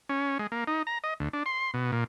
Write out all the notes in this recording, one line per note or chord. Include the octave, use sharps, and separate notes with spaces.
C#4
G#3
A#3
D#4
A#5
D#5
D2
D4
C6
B2
A#2